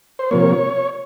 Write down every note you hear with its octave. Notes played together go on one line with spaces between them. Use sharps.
C5
C3 F3 A#3 C#5